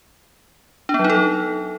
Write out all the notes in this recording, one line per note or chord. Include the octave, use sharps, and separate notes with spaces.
D4
B3
F#3
D#4
A4